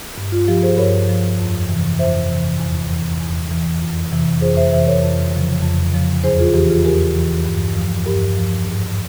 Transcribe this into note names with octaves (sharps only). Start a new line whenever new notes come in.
G2
F4
F3 G4
G#4 C5
G2 A#4 C#5
F3
F2
C3 E3
F2 C5 E5
C3 E3
E2
E3
E2
E3
F2
C3 E3
F2 G#4 C5
C5 E5
C3 E3 C5 E5
A#4 C#5
F2
C#3 F3
F2
C#3 F3
E2 G#4 C5
F4 G#4
E3 G4
F4 G#4
E2 G4 A#4
E3
G2
F3
G2 G4 A#4
F3
G#2